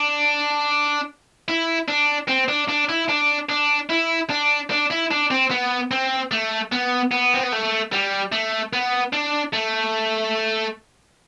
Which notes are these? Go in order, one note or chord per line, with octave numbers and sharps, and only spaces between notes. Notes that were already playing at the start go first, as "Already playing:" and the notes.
Already playing: D4
E4
D4
C4
D4
D4
E4
D4
D4
E4
D4
D4
E4
D4
C4
B3
C4
A3
B3
B3
C4
B3
A3
G3
A3
B3
D4
A3